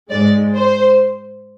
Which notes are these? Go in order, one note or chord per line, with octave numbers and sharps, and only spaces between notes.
G#2 G#3 D5
C5